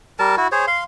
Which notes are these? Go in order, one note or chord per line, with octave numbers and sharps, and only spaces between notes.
G3 A#4 A5
E4 F#4
G#4 C5 C#5
F5 C6